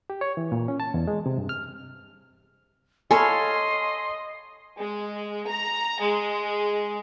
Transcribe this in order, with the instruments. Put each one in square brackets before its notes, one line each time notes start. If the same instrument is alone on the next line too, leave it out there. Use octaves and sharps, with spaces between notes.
[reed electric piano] G4
C#5
E3
A#2
C#4
A5
E2
G#3
C3
G2
F6
[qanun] A4 C#5 F5 [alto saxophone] D#5 [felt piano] G#5 A5 B5 [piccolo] C6
[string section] G#3
A#5
G#3